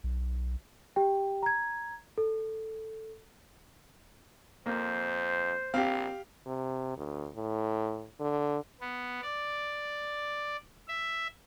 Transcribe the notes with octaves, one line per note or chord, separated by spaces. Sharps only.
B1
G4 G5
A#5 G#6
A4
F2 A#3 C5
A#1 C4 G4 F5
C3
D2
A2
D3
B3
D5
E5